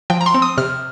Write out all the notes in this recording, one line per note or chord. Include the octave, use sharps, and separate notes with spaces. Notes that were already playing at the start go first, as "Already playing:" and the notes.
F3 G5
A#5
C6
C4
D#6
C3 F6